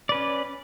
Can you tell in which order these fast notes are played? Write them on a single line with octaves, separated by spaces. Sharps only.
D5 B4 C#4